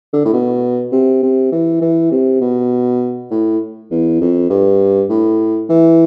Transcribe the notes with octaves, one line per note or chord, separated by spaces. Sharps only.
D3
A2
B2
C3
C3
E3
E3
C3
B2
A2
E2
F2
G2
A2
E3